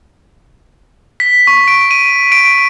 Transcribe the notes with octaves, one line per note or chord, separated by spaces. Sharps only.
B6
C#6
D7
D#7
D7